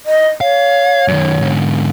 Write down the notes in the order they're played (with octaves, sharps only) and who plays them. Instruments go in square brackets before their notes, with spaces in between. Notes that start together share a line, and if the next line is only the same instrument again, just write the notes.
[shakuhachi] D#5
[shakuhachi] C#5 [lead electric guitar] F5
[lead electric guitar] F#2 D#3
G#2 D3